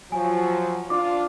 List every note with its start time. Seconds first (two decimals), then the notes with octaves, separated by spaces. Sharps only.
0.12 F3 F#3 G#5
0.90 D4 F4 D6